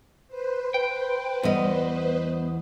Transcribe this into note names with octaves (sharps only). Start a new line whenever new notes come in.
B4 C5
G5
E2 G3 B3 D#5